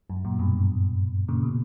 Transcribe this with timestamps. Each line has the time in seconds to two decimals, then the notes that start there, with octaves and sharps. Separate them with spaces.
0.10 F#2
0.25 F#2 A#2
0.39 G2 B2
1.28 A#2 C#3
1.43 B2